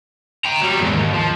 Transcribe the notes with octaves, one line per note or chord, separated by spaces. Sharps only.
G5 A#5
F#3 G3
E2 G#2
D#2
F3